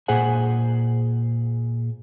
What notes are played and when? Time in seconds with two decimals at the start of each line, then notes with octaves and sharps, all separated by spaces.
0.08 A#2 G#4 C5 F#5 G#5